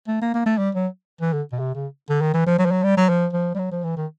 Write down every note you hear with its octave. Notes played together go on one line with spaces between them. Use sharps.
A3
A#3
A#3
A3
G3
F#3
E3
D3
B2
C3
C#3
D3
D#3
E3
F3
F#3
F3
F#3
G3
F#3
F3
F3
G3
F#3
F3
E3
D#3